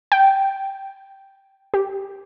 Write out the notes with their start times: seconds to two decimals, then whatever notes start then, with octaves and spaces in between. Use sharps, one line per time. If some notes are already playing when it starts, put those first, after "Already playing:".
0.12 G5
1.74 G4